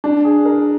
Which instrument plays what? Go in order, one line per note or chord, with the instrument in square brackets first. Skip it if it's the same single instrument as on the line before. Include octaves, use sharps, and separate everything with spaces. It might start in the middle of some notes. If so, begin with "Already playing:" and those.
[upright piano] D4
G#4
A#4